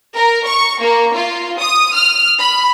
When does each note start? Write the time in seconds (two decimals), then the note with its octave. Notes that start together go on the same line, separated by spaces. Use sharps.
0.15 A#4
0.46 C#6
0.81 A#3
1.15 F4
1.59 D#6
1.95 F6
2.38 B5